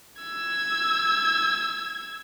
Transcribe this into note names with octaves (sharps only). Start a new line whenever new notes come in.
E6 G#6